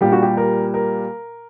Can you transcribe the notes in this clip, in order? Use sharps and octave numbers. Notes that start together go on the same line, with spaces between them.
A#2 G3 G4
F#4
G4
A#4
A#4